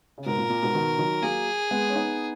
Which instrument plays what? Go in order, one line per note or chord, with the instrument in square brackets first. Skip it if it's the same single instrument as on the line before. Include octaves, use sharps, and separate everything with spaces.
[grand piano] C#3
[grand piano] G#2 B2 [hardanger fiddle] A#4
[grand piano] A#2
A#2
G#2 B2
B2 D#3
D#3 F#3
[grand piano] F#3 A#3 [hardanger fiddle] G#4
[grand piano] G#3 B3
C#4
B3 D#4